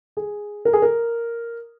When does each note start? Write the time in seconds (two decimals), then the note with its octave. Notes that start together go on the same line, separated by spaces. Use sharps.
0.17 G#4
0.65 A#4
0.73 G#4
0.82 A#4